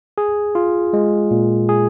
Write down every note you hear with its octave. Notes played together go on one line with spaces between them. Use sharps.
G#4
F4
G#3
A#2
G#4